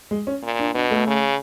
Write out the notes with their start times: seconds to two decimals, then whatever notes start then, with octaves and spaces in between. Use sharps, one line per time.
0.11 G#3
0.27 C#4
0.43 A#2
0.59 D4
0.74 B2 D4
0.91 A3
1.07 C#3